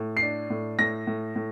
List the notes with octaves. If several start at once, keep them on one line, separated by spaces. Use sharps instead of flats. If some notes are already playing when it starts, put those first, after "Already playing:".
Already playing: A2
C7
D4
A2
A2 A#6
A2
A2